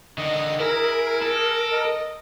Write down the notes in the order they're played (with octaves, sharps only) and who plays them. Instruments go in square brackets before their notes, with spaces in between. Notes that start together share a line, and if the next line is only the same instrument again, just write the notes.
[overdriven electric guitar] D3 D#3 [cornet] D#5
[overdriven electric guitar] E4 [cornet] G#4 [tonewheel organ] A#4
[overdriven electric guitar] A4
[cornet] D#5